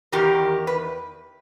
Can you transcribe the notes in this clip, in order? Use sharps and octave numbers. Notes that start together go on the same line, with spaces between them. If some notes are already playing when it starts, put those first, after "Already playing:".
E2 D#3 G4 A#4
B4